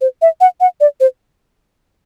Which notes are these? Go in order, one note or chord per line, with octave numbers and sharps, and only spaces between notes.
C5
E5
F#5
F#5
D5
C5